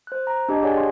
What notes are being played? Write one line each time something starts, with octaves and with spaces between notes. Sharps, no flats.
C5 F#6
A#5
D4 G4 D#5 G#6
G4 G#4 C#5 D5 F#5 G#5
C6